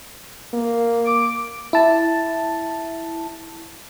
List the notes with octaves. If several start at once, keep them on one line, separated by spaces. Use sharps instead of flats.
A#3
D6
E4 A5